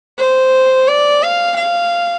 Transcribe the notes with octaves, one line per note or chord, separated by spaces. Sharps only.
C5
D5
F5
F5